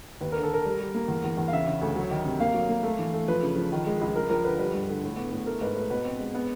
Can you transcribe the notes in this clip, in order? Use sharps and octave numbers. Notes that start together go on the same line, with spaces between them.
D#2 B4
D3 A#4
A4
D3 A#4
G3
G3
A#3
E2
E2
E2
F5
C#3 E5
C#3
D2
F#3
D#3
C3
A#3 F5
F#3
A#3
A3
E3
A3
F3 B4
C#3
F3
D#3
G#3
C#2
F3 A#4
F3 A#4
D3 B4
G3 B4
G2
D3
A2
B3
A2
A3 A#4
G#2 B4
A3 B4
B2 B4
C4
G#3
B3